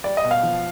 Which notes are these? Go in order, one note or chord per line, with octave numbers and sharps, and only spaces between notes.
G3 D5
D#5
B2
F5
F3